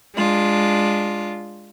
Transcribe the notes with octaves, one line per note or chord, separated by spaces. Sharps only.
G#3 D4 F4